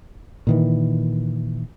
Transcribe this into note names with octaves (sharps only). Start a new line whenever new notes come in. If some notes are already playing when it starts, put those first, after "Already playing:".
A#2 D#3 E3